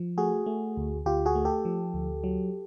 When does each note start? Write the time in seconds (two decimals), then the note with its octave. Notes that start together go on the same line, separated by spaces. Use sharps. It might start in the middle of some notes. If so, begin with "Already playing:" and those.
Already playing: F3
0.18 A3 F#4 G#4
0.46 A3
0.77 D2
1.05 D2 F4 G4
1.26 F#4 G#4
1.35 A3
1.45 G4 A4
1.65 F3
1.94 D2
2.24 F#3